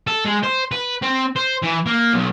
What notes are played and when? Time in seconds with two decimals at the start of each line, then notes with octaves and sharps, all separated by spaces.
0.07 A4
0.25 G#3
0.44 C5
0.72 B4
1.02 C4
1.36 C5
1.63 E3
1.87 A#3
2.14 B1